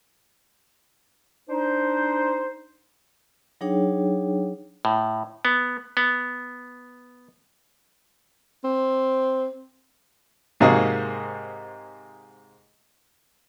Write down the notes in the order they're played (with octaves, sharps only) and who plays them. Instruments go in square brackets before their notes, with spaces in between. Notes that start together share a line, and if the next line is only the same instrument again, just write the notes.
[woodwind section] D4 D#4 C5
[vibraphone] F#3 D4 D#4 G#4 C#5 G5
[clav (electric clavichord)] A2
B3
B3
[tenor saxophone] C4
[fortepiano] G#2 C3 A#3 D#4 F#4 G#4